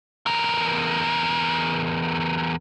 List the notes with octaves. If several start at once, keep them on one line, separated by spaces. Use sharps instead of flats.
E2 A#4